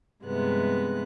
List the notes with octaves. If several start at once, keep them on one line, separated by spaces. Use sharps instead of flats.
G2 C3 E3 G#3 B3 F#6